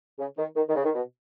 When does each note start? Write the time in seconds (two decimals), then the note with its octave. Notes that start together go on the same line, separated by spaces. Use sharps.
0.19 C#3
0.38 D#3
0.56 D#3
0.69 D#3
0.76 C#3
0.84 D#3
0.95 B2